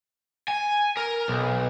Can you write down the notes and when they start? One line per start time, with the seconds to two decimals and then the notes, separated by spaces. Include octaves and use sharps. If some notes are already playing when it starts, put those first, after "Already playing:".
0.48 G#5
0.97 A#4
1.28 B1